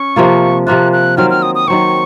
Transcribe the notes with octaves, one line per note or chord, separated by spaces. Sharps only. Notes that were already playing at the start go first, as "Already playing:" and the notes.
Already playing: C#4 C#6
C3 F3 A#3 F4
C3 F3 A#3 F4 F#6
F#6
D#3 F#3 C4 F6
F6
D#6
D#6
D#3 F#3 C4 C#6